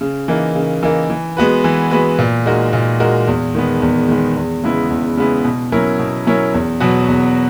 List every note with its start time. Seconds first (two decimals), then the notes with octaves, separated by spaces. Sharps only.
0.01 C#3
0.28 E3 A#3 D#4 A#4
0.55 C#3
0.83 E3 A#3 D#4 A#4
1.10 E3
1.37 G#3 B3 F#4 B4
1.64 E3
1.91 G#3 B3 F#4 B4
2.19 A#2
2.46 G#3 D#4 F#4 A#4
2.73 A#2
3.00 G#3 D#4 F#4 A#4
3.28 E2
3.55 D#3 G#3 B3
3.82 E2
4.09 D#3 G#3 B3
4.36 E2
4.64 C#3 G#3 B3 E4
4.90 E2
5.17 C#3 G#3 B3 E4
5.44 B2
5.72 F#3 C#4 E4 A#4
5.99 B2
6.27 F#3 C#4 E4 A#4
6.54 E2
6.80 B2 F#3 B3 F#4
7.08 E2